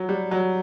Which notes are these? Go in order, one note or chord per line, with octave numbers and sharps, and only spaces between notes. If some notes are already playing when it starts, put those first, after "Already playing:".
Already playing: F#3
G3
F#3